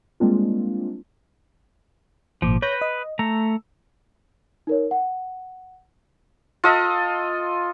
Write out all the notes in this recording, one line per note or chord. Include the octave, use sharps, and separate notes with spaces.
G3 G#3 A#3 C4 D4 F4
G#1 A#2 F3 D6
B4 C#5 G6 A#6
D#5
A3 A#5 E6
D#4 A#4 C#5
F#5
F4 A4 D#5